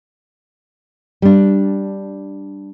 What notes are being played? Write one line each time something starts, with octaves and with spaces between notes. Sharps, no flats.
G3 D4